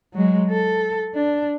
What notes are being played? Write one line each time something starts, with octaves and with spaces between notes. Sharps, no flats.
F#3 G#3
A4
D4